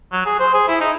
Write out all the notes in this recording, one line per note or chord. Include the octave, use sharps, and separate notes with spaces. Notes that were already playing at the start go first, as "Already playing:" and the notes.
F#3
G#4
C5
G#4
E4
D#4